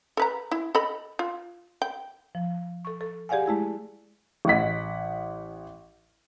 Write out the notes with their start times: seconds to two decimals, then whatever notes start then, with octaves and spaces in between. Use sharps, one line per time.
0.17 A4 B4 A#5
0.51 E4
0.75 A4 D#5 B5
1.19 F4
1.82 G5
2.35 F3
2.85 A4 C#6
3.01 A4
3.29 G4 G#4 D5 F5 F#5 G#5
3.46 G#3 A3 E4 G#4
4.45 A1 D#5 F#5 B6